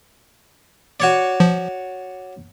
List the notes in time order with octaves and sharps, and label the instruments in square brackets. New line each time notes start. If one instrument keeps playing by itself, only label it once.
[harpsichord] F#4 C#5 D5
[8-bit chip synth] F3